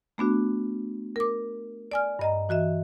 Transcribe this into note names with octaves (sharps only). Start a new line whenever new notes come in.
A3 B3 D4 F#4
A#4 D6
D5 G#5 F6
G2 D#5 A#5
E3 F#4 D#5 E5